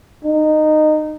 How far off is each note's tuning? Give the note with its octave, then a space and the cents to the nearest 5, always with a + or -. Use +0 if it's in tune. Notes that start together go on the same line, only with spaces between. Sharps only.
D#4 -15